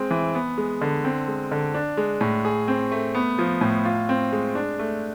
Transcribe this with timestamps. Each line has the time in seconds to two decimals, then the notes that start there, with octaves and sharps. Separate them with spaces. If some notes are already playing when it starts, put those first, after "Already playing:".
Already playing: G#3 C4
0.11 E3
0.35 B3
0.58 G#3
0.81 D3
1.04 C4
1.28 G#3
1.52 D3
1.74 D4
1.97 G#3
2.21 A2
2.45 G#4
2.68 C4
2.92 A3
3.15 B3
3.39 F3
3.61 A2
3.85 F4
4.09 C4
4.32 G#3
4.55 D4
4.79 A3